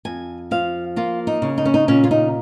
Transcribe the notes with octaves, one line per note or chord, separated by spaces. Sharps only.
F2 G#5
F3 F5
A#3 F4
D#4
C#3
D#4
C#4
D#4
A#2 C#4
F4
D#4